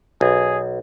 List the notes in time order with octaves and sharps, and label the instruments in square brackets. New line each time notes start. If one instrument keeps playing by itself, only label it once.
[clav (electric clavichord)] B1 [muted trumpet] G#4